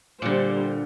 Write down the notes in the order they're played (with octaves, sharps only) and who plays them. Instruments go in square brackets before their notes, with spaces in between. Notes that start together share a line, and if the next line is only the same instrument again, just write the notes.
[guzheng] A#2 D3 [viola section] G3 C5